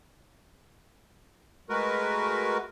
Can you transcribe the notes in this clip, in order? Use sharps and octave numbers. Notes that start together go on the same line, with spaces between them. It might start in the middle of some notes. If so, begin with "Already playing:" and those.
G#3 A3 F#4 A#4 B4